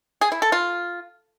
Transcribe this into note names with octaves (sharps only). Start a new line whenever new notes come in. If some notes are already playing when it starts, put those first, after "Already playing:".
G#4
E4
A4
F4